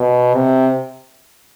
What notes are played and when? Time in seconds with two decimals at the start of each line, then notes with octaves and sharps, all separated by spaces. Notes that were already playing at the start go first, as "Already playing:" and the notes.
Already playing: B2
0.34 C3